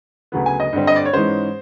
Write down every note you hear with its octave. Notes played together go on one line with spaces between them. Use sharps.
D2 C#3 F#3 B3
G#5
D#5
G2 D3 G3 C4
D#5
D5
C#5
G#2 E3 G#3 C#4 C5